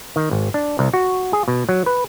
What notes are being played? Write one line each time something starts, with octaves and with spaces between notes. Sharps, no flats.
D#3
G#1
D4
C2
F#4
G#4
B2
F#3
B4